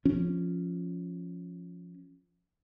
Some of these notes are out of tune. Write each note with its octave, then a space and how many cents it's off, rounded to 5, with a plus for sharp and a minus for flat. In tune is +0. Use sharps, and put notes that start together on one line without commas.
F3 +0 C#4 +0